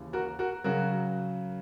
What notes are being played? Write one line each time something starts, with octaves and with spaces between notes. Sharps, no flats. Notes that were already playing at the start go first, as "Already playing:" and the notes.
Already playing: D#2 C#3 E3
F#4 A#4
F#4 A#4
C#3 F#3 F#4 A#4